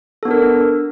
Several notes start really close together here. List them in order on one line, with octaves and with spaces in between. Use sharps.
A4 B3 D4 A#4